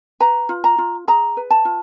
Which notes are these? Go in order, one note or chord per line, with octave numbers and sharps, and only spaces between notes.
B4 A#5
F4
A#5
F4
G#4 A#5
B4
A5
F4